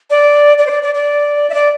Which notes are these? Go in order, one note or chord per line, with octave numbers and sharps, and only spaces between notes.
D5
D5
C5
D5
D5
D5
E5
D5